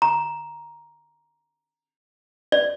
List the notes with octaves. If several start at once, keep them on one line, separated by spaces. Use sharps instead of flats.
A#5
D5